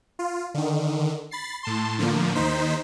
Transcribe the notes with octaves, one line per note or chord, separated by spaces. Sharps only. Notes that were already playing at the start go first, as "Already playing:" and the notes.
F4
D3 D#3
B5 A6 C7
A2 A5 C6
A2 D3 F3 A#3
D#2 D#3 D#4 C5 B6